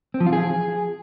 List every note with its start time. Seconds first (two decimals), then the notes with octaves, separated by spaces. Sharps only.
0.14 C4
0.20 F3
0.26 F4
0.33 G#4